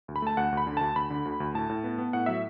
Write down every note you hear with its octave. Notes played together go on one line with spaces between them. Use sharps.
D2
B5
A3 A5
D2 F#5
D2
B5
D3
D2 A5
D2 B5
D3
D2
D2
A2 A5
A2
B3
B3
A2 F#5
F#3 E5